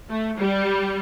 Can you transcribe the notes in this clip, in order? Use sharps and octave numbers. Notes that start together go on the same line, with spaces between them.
A3
G3